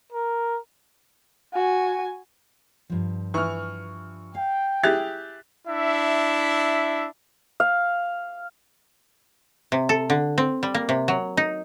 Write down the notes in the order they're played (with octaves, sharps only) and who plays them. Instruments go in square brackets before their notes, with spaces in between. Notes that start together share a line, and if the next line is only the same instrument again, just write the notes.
[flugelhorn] A#4
[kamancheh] F#4 G#5
[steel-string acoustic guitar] G2 F3
[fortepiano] E3 [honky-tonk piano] C#6 F6
[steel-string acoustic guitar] F5 [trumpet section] G5
[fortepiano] E4 G4 G#4 [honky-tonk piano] F#6 A6 F7
[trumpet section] D4 E4 E5
[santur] F5
[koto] C3
A4
D3
C4
G3
A#3
C3
F#3
D#4